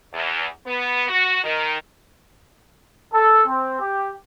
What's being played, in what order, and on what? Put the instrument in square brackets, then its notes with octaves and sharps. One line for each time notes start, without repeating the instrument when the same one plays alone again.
[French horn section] E2
B3
F#4
D#3
[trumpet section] A4
C4
G4